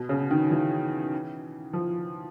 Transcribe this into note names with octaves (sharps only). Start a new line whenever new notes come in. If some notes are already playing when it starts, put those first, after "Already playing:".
Already playing: B2
C#3
D#3
E3
F3